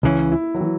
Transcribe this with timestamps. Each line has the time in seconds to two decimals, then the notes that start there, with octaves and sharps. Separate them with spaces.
0.03 C#2 C#3 E3 C#4 E4
0.32 E4
0.55 F#3
0.61 E3